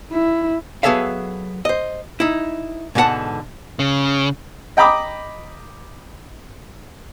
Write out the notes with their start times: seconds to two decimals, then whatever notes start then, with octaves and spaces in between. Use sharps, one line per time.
0.12 E4
0.83 F#3 B3 G#4 A4 E5 F5
1.65 C5 D#5
2.20 D#4 E4
2.95 G#2 B2 D3 F4 F#5 A5
3.79 C#3
4.77 D#5 G5 A#5 B5 D6 D#6